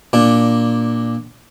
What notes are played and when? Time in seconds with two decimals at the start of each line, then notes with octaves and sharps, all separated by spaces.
0.13 A#2 D4